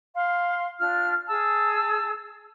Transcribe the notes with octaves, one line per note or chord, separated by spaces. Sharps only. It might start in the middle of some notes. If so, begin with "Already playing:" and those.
F5 C6
D4 F4 F6
G#4 A5 E6